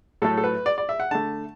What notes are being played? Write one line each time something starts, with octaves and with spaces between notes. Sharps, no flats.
A2 F#3 A3 A4
A4
B4
D5
D5
E5
F#5
D3 A3 A5